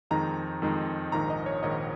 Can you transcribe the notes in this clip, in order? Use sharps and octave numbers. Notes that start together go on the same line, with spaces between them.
F2 D#3 G#3 D#4 A#5
F2 D#3 G#3 D#4
A#1 G#2 D#3 A#5
D#5
C#5
A#1 G#2 D#3 D#5